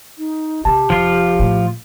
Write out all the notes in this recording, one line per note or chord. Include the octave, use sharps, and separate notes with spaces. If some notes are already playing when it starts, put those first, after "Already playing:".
D#4
C3 G4 A5
F1 F3 F4
A2